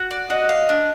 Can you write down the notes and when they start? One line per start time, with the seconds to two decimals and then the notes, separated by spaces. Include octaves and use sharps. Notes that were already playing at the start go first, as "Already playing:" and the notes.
Already playing: F#4
0.11 D5
0.30 F#4 D#5
0.49 F5
0.69 D4